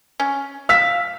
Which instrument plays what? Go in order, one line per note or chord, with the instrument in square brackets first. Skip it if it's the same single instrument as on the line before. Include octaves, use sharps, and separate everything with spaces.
[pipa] C#4
[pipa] F5 [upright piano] E6 B6